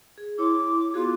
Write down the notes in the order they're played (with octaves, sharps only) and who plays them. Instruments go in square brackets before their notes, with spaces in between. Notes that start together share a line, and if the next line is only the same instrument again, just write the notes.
[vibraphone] G#4
[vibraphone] E4 C#5 C6 [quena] D6
[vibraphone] B3 F#4 G#4 [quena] F4